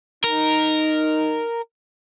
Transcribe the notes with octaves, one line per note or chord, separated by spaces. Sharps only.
D#4 A#4